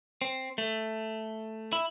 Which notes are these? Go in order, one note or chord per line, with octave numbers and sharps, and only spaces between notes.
C4
A3
E4